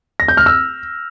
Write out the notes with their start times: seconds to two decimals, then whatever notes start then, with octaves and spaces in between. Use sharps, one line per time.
0.20 A#6
0.28 G6
0.37 F6
0.46 E6